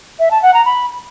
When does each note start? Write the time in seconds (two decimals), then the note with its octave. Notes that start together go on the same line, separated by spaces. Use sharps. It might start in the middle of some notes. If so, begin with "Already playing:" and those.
0.19 E5
0.31 A5
0.42 F#5
0.54 A#5
0.66 B5